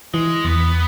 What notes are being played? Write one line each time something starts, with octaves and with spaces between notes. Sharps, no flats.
E3 G#3
E2 B3